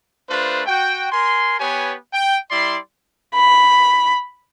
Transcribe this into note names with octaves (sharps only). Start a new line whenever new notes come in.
A3 D4 F4 B4 C5
F#4 G5
A#4 G#5 C6
B3 G4 B4 C#5 G#5
G5
G3 E4 D5 C6
B5